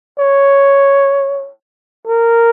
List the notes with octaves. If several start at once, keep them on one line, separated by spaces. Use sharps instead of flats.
C#5
A#4